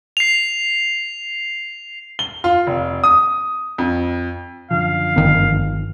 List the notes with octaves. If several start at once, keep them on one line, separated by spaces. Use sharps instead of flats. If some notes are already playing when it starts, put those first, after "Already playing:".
C7 F7
G7
F4
F1
D#6
F2
F#2 D3 F3 F5
G1 D#3 B3